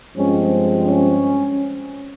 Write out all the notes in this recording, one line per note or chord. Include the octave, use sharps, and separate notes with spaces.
G2 F3 G#3 C4 C#4
C#4